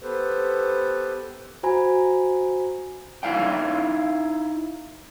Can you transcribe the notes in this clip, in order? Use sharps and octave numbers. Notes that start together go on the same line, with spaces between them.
B3 G4 A4 B4 C5
F#4 C5 G#5 A#5 B5
D#4 E4 E5 F5 G5